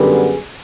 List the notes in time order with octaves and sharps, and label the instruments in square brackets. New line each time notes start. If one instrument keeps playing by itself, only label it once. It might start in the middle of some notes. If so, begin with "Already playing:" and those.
Already playing: [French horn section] F#2 D3 G3 B3 G#4